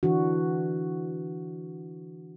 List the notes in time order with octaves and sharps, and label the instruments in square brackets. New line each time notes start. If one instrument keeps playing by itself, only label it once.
[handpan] D3 E3 D4 F#4